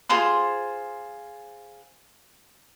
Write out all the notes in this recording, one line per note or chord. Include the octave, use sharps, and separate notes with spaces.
F4 G#4 C5 C6